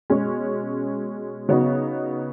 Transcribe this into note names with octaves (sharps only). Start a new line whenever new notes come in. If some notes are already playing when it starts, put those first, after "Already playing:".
B2 G#3 C#4
C#3 F#3 B3 D#4 F#4